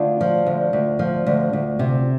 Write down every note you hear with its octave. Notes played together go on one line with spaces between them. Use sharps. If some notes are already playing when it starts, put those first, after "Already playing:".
Already playing: D2 D4 F4
F3
D2
D2
F3
D2
D2
C3